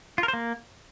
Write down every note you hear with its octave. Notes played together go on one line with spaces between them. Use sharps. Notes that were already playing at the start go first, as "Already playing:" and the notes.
F4
A#4
C5
A#3